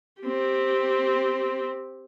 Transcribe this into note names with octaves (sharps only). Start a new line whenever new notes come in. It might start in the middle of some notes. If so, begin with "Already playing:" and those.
C4 G4